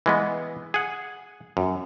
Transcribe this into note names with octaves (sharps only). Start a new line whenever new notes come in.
E3 G#3 B3
G#4 F#5
F#2